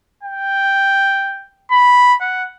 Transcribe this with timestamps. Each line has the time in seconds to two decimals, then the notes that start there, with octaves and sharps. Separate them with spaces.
0.23 G5
1.72 B5
2.21 F#5